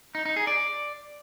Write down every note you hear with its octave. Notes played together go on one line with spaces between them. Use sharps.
D#4
D#4
G#4
D5